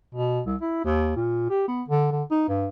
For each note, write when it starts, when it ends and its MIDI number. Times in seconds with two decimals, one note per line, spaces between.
0.15 0.41 47
0.46 0.56 36
0.61 0.84 64
0.84 1.13 39
1.16 1.48 46
1.50 1.67 67
1.68 1.83 59
1.88 2.09 50
2.12 2.23 50
2.31 2.48 63
2.49 2.67 43